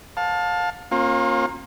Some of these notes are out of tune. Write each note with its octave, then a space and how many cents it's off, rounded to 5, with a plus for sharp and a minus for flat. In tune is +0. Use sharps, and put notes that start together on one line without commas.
F5 +30 A5 +0
A#3 +0 C#4 -45 F4 +25